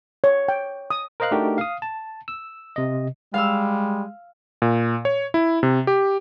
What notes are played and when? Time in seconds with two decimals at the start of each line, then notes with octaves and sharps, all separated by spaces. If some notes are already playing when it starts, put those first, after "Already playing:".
0.24 C#5
0.49 G5
0.90 D#6
1.20 A#4 C5 D#5 F5 F#6
1.31 A3 D4 D#4 F#4 G4 A#4
1.58 F5 D#6
1.82 A5
2.28 E6
2.76 C3 D#5
3.34 G3 G#3 F5 E6
4.62 A#2
5.05 C#5
5.34 E4
5.63 C3
5.87 G4